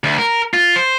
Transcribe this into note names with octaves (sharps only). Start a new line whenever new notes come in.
D2
A#4
F4
C5